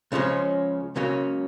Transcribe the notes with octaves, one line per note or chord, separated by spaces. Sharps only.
C#2 C#3 F3 G#3 C#4
C#2 C#3 F#3 A#3 C#4